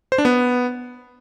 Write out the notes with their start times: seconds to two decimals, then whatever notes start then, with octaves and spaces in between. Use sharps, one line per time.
0.12 C5
0.18 D4
0.25 B3